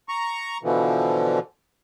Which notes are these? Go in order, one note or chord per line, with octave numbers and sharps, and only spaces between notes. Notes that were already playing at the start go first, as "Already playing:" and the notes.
A#5 C#6
B2 D3 E3 F3